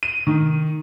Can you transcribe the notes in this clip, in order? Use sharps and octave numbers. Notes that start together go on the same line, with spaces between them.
D#7
D#3